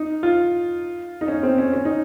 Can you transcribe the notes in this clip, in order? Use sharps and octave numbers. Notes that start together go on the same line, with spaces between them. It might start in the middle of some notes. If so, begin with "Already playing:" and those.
Already playing: D#4
F4
D#4
C#4
C4
C#4
C#4
D#4